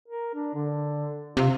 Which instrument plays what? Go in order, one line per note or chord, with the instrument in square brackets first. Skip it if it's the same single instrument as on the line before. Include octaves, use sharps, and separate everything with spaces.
[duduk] A#4
D4
D3
[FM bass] C3 [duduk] F4